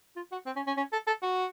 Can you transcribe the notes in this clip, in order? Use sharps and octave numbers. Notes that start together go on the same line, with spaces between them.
F4
F#4
C4
C#4
C#4
C#4
A4
A4
F#4